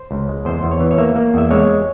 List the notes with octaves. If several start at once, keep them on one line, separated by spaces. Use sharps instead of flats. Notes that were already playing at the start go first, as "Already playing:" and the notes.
Already playing: C5
C#2
G#3
E2 C5
E2
C#5
E3
C#5
A#3 E5
A#3
E2 E5
G#3 C#5